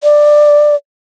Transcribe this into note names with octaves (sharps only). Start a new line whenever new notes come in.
D5